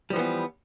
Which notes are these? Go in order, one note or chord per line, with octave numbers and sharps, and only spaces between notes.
E3 F3 G3 B3